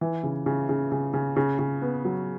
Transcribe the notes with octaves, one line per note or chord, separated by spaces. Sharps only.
E3
C#3
C#3
C#3
C#3
C#3
C#3
C#3
B3
F#3